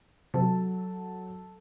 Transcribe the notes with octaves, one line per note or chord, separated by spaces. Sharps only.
C3 F#3 A4